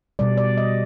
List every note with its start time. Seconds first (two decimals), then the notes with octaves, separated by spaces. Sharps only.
0.19 B2 G3 D5
0.38 D5
0.57 D#5